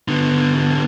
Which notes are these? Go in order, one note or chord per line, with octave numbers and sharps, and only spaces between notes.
D3 B3